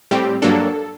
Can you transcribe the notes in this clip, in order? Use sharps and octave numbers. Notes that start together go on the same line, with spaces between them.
A2 G3 C4 G4
G2 F#3 A#3 D4 A4